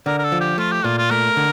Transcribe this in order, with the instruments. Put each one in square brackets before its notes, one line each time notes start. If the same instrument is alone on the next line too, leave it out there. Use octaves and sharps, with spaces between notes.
[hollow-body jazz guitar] D3 [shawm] A#4
[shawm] A#4
A4
[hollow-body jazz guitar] F3
[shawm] G4
[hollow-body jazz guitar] A3 [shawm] F4
[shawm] G4
[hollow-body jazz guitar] A#2 [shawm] F4
[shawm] F4
[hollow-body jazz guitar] A3 [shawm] A#4
[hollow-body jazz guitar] D3